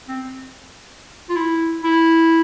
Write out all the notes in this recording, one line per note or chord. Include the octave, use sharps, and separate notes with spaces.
C4
F4
E4
E4